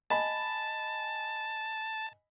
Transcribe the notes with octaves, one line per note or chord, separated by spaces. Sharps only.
D#5 G#5 A5 B5